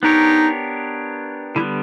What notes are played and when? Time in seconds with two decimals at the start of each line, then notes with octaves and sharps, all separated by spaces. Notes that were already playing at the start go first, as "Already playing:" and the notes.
0.03 B3 D4 D#4 G4 A#4 C#5
1.55 D3 G3 B3 E4